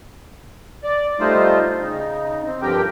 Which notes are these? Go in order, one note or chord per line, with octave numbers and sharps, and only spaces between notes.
D5
G3 A3 D#4 F4 C5
C#3 D#4
C4
G2 D3 F3 G4 A#4 G5